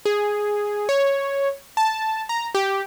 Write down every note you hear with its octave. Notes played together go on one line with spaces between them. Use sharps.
G#4
C#5
A5
A#5
G4